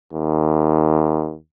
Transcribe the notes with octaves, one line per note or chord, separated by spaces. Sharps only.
D#2